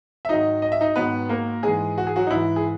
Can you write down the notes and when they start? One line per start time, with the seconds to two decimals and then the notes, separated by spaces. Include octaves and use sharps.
0.25 E5
0.29 G#2 D#3 F#3 D#4 D#5
0.62 D#5
0.72 E5
0.81 D#4 D#5
0.96 G#2 D#3 F#3 B3 B4
1.29 A#3 A#4
1.63 G#2 E3 G#3 G#4
1.98 F#4
2.07 G#4
2.16 F#3 F#4
2.27 D#4
2.31 G#2 E3 E4
2.56 G#4